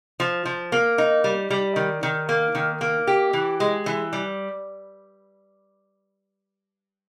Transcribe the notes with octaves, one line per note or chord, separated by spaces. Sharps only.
F3
F3
A#3
D#4
G3
G3
D#3
D#3
A#3
D#3
A#3
G4
E3
G#3
E3
G3